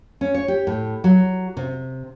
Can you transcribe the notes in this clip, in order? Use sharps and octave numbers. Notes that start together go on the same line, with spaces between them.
C#4
C#5
G4
A2
F#3
C3